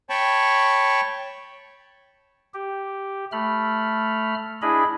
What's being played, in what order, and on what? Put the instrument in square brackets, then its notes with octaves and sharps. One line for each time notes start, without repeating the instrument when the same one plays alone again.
[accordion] C#5 G5 A5 B5 C#6
[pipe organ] G4
A3 B5 F6
D4 E4 G#4 D#5 B5